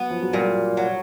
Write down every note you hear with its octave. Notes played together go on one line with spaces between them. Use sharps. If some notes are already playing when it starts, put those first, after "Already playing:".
Already playing: F#3 B3
F3
F#3
A#2 G3
F#3